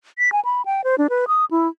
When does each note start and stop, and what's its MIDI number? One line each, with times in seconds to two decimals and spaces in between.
0.18 0.32 95
0.32 0.40 80
0.45 0.62 83
0.66 0.82 79
0.84 0.96 72
0.98 1.07 62
1.10 1.25 71
1.28 1.45 87
1.51 1.68 64